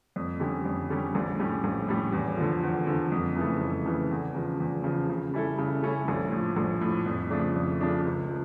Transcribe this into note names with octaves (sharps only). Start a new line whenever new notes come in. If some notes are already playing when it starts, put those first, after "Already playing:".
F2
D3 G3 C#4 G4
F2
D3 G3 C#4 G4
A#1
A2 G3 C#4 G4
A#1
A2 G3 C#4 G4
E2
D3 F3
E2
D3 F3
F2
C#3 E3 A3
F2
C#3 E3 A3
E2
C#3 F3
E2
C#3 F3
C#3
G3 C#4 E4 A4
C#3
G3 C#4 E4 A4
A#1
A2
F3
A#1
A2 F3
F2
C#3 F3 A3 D4
F2
C#3 F3 A3 D4
C#2
F3